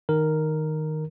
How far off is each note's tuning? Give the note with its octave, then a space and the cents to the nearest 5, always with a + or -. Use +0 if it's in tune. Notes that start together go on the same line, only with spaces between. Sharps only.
D#3 +0 A#4 +0